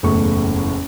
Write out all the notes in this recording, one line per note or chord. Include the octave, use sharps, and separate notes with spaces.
F#1 E2 A2 A3 C#6